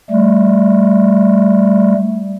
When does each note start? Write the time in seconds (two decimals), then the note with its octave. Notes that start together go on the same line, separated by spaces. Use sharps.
0.10 G3 A3